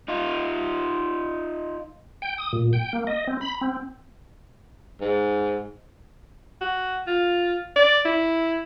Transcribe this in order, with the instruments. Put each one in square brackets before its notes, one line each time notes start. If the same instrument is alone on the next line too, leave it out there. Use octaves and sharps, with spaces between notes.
[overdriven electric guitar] D#4 F4
[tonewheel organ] G5
D#6
A#2
G5
A#3
D#5
C4
B5
C4
[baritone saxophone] G#2
[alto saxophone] F#4
F4
D5
E4